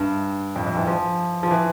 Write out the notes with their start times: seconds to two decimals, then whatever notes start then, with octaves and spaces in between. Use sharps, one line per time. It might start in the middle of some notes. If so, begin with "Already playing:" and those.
Already playing: G2
0.56 F2
0.67 F2
0.77 E3
0.87 F3
1.43 F3
1.51 E3